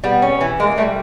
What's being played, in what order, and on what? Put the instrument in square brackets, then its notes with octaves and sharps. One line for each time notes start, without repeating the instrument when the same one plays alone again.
[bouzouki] G3 [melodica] B3
[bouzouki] C#4
E3
[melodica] G#3 [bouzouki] A#3
[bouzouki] G3 [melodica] A3